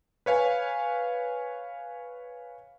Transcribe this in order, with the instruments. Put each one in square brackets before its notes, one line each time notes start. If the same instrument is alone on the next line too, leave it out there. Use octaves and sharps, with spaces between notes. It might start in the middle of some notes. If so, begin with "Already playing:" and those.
[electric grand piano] B4 C#5 F5 G#5